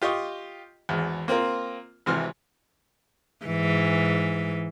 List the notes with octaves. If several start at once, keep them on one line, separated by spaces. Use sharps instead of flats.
F4 G4 D#5 C#6
G#1 E2
A#3 C4 F4 A#4
G#1 C3 E3 C6 F6
G#2 E3